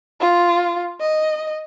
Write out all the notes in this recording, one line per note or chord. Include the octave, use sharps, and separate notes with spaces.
F4
D#5